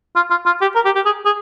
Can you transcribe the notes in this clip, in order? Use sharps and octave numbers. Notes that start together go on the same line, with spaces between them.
F4
F4
F4
G4
A#4
G4
G4
G#4
G#4